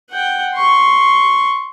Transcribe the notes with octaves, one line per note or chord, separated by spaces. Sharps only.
F#5 G5
C6 C#6